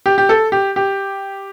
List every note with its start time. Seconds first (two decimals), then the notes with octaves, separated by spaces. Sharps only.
0.06 G4
0.18 G4
0.29 A4
0.52 G4
0.76 G4